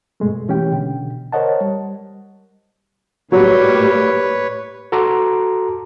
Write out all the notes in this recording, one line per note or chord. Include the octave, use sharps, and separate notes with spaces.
G2 B2 G#3 A3
E3 C#4 G4 G5
B2 D3
A#4 C5 C#5 D#5 F#5 A5
G3
A2 F#3 G3 A#3 B4 C#5
F#4 A4 A5 A#5 C6 D6